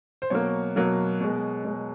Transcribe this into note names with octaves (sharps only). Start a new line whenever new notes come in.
C5
B2 F#3 A#3 C#5
B2 F#3 A#3
B2 G#3
B2 G#3